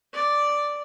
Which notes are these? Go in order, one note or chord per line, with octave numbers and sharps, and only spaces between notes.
D5